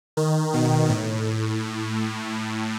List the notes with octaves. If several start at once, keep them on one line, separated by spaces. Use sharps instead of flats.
D#3
B2
A2